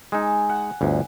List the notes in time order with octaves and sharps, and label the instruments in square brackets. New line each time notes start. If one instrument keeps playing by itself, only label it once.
[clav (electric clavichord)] G#3 D#4 [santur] G#5 E6
[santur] F#5
[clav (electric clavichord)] G1 D2